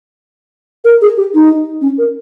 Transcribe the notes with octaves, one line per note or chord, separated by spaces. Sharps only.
A#4
G#4
G4
D#4
C#4
A#4